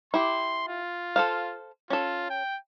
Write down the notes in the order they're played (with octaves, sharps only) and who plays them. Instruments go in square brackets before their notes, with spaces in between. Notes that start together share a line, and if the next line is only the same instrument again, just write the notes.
[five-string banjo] E4 G4 [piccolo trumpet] C6
[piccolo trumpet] F4
[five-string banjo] A4 C5 F5
[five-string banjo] C#4 A4 [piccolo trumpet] F4
[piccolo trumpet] G5